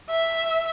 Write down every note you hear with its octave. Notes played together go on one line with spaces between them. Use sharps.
E5